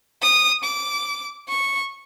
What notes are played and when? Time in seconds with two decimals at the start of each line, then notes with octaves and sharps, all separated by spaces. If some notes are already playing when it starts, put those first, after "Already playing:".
0.22 D#6
0.64 D6
1.49 C#6